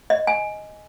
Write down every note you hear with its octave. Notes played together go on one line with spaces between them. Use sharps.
D#5
G#5